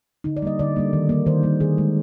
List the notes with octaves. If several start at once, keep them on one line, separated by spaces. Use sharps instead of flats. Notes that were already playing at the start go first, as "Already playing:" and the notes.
D3 D#4
D5
G3 A#3 D#5
D3 D5
G3 A#3
D#3
G3 A#3
D#3 C5
G3 A#3
D#3 G#4
G#3